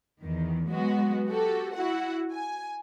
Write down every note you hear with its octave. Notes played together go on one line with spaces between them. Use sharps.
E2 D#3
F#3 G#3 B3 F#4
F#4 G4 A4
E4 F#4 F#5
G#5